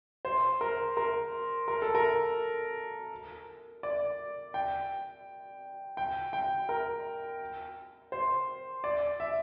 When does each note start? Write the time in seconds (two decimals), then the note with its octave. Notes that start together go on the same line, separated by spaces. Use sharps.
0.25 C5
0.61 A#4
0.97 A#4
1.68 A#4
1.82 A4
1.95 A#4
3.83 D5
4.54 G5
5.97 G5
6.33 G5
6.69 A#4
8.12 C5
8.84 D5
9.20 E5